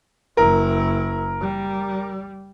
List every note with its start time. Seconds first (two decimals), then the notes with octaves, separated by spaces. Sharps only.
0.37 F#1 E4 A#4
1.41 G3